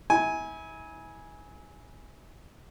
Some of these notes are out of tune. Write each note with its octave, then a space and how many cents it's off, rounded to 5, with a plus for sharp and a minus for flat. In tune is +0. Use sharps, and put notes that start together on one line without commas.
E4 -40 G#5 +0